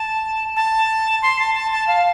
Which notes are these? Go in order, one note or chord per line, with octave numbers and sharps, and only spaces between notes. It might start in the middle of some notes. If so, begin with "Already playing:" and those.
Already playing: A5
A5
C6
A5
A5
A5
F5